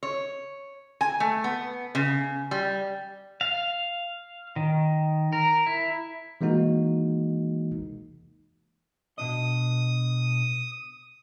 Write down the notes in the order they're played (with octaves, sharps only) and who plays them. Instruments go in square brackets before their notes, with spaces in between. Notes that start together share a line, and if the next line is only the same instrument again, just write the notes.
[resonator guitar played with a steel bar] C#5
G#5
A3
B3
C#3
G3
[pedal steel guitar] F5
D#3
A#4
E4
[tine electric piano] E3 G#3 A#3 D#4 F#4
[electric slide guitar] B2 D4 D#5 [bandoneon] D#6